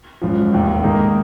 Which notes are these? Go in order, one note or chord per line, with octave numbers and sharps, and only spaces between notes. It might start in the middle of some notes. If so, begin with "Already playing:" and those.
G#1 F#2 F3
F1 D#2 D#3
G#2 D#3 A#3 D#4